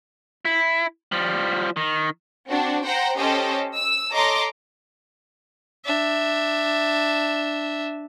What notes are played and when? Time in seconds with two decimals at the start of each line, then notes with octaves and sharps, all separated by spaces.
0.45 E4
1.12 F3 G3
1.76 D#3
2.49 C4 D4 F#4
2.85 C5 F#5 G5 A#5
3.18 C#4 G4 A4 C5 D#5
3.75 E6
4.13 A4 C#5 D#5 A#5 C6 D6
5.85 D4 E5